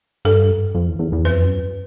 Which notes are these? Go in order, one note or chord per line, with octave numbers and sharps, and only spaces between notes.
G2 A4
F2
E2
E2
E2
F2 B4
F#2